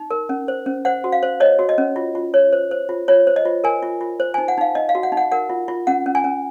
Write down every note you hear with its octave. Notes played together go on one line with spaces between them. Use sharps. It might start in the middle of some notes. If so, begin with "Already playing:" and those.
Already playing: D#4
A#4
C#4
C5
C#4
C5 F#5
F#4
F5
C5
C#5 D#5
F#4
D#5
C#4
F4
F4
C#5
C5
C5
F4
F4 C#5
C5
D#5
F4
A#4 G#5
F4
F4
C5
G#5
D#4
F#5
D#4 F5
D#4 D#5
F5
F#4
F#5
D#4
F#5
A#4 F#5
F4
F4
C#4 F#5
C#4
G#5
C#4